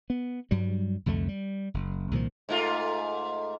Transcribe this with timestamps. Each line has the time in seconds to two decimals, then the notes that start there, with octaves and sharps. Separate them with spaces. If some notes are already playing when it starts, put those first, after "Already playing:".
0.10 B3
0.51 G2 F#3 G3
1.06 C2 F2 D3 A3
1.29 G3
1.74 F#1
2.11 C2 A#2 D#3 F3
2.49 G#2 A3 F4